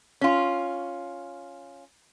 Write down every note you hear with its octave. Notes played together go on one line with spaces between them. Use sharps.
C#4 F4